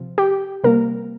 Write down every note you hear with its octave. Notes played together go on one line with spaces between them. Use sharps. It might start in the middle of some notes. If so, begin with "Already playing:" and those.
Already playing: C3 F3
G4
C3 G3 A#3 A#4